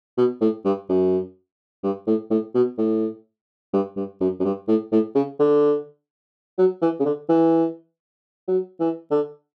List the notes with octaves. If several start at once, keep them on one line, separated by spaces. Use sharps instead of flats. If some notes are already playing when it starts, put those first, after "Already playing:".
B2
A2
G2
F#2
G2
A2
A2
B2
A2
G2
G2
F#2
F#2
G2
A2
A2
C#3
D3
F#3
E3
C#3
D3
E3
F#3
E3
D3